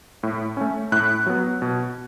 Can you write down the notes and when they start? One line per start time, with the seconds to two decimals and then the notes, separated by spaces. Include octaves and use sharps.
0.23 A2
0.57 A3 C#4
0.92 A2 F#6
1.26 F#3 B3
1.62 B2